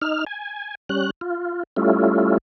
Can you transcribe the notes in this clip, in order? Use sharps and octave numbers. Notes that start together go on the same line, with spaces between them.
D#4 F6
G#5
G3 C#4 F#6
F4
G3 A3 C#4 E4 F4